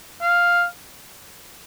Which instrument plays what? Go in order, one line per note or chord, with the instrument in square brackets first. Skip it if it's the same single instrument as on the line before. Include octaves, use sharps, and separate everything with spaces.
[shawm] F5